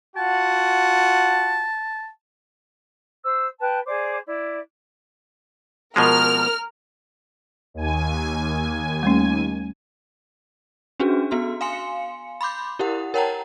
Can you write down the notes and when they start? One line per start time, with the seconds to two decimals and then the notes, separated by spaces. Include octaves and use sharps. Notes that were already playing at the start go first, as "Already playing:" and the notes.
0.16 F4 F#4 F#5 A5
3.23 C5 E6
3.59 B4 G5 A5 F#6
3.86 G#4 C5 D5 D6
4.26 E4 D5
5.96 B2 F3 G#3 A#4 F6
7.74 D#2 G#5
9.03 G3 A3 C#4
11.00 C#4 D4 F#4 G#4
11.31 B3 F#4 C6
11.61 F5 G#5 C6 C#7
12.41 B5 C6 D6 G6
12.79 E4 G4 A#4 F#5
13.14 A#4 C#5 F#5 G5 A5 A#5